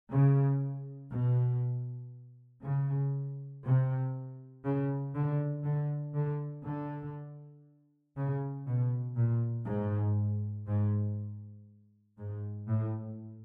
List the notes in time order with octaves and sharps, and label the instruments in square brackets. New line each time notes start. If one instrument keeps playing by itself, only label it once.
[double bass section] C#3
B2
C#3
C3
C#3
D3
D3
D3
D3
C#3
B2
A#2
G#2
G#2
G#2
A2